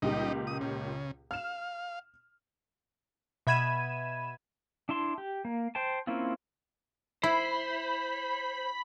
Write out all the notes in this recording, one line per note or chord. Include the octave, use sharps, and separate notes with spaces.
C#2 A#2 G3 D#4 G4
D#6
C#3
F5 F6 E7
B2 E5 B5 G#6 D#7 E7
D4 E4 A5 C6
G4
A#3
C5 G5 A5
A#3 C4 C#4 E4 F4
E4 C5 B5